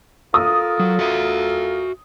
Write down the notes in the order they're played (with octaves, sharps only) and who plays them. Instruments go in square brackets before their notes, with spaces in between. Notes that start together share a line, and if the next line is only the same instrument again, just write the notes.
[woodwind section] F4 A4 A#4 [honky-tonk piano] D#6
[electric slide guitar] F#3
F#4 E5